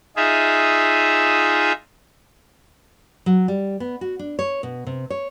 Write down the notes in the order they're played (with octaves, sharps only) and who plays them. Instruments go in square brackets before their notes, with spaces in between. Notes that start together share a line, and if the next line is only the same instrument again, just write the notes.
[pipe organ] D#4 F4 G#4 E5
[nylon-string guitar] F#3
G3
B3
F#4
D4
C#5
B2
C3
C#5